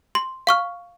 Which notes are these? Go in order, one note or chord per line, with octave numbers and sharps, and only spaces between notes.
C6
F5 C#6 F6